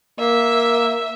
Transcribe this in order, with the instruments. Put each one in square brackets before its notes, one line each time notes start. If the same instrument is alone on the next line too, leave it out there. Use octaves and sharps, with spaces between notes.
[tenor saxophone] A#3 [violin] E5